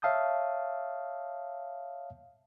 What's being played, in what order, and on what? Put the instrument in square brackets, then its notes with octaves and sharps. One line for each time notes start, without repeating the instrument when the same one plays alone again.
[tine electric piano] C#5 E5 F5 A5 D#6 G6